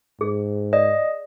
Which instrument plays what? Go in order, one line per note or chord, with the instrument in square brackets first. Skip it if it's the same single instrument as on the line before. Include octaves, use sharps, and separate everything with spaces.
[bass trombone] G#2 [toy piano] G#4
[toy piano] D5 [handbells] D#5